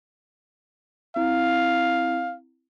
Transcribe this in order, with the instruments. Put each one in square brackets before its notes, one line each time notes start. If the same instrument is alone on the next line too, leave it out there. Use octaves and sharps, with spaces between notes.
[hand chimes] C4 E4 [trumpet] F5